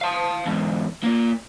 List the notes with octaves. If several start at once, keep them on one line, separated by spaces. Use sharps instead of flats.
F5 A5
E2 G#2
A#2 A#3